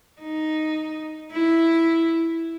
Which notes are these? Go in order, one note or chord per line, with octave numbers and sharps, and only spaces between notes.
D#4
E4